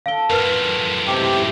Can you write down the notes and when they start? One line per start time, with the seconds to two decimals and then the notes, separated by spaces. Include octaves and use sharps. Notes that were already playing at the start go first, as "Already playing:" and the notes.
0.06 D4 A4 F5 F#5 D7 G7
0.30 F#2 A2 F4 A#4 B4 F6
1.07 G#2 C3 E4 G4 C6